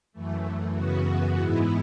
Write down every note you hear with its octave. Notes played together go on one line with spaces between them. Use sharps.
F#2 E3 A3
F#2 C#3 E3 B3 F#4
G#2 E3 G#3 B3 E4